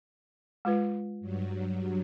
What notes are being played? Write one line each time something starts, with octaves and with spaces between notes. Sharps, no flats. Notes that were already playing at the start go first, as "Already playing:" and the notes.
G#3 F4 B4
G2 F#3